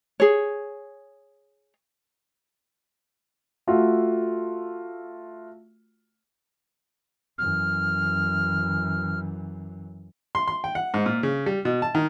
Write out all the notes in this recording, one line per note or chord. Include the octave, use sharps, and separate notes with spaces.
G#4 C#5
A3 F4 F#4 E5
F#2 E3 F6
C6
C6
G5
F#5
G#2
A#2
C#3
G3
B2
A5
D#3